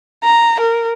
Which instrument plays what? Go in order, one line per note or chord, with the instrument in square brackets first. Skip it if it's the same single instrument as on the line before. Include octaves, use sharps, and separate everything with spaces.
[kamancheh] A#5
A#4